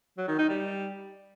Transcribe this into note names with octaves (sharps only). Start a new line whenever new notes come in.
F#3
D#3
D#4
G3